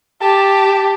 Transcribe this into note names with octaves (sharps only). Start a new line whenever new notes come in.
G4 A5